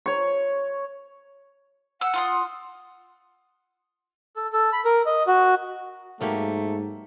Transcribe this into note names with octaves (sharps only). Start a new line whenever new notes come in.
C#5 C#6
F#5 E6
F4 C6 D#6
A4
A4
B5
A#4
D#5
F#4
G#2 F#3 A3 A#3 G4